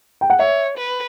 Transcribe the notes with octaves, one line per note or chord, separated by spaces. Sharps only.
G5
F#5
C#5 E5
B4